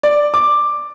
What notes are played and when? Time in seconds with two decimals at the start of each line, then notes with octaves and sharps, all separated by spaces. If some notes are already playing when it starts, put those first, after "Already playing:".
0.03 D5
0.34 D6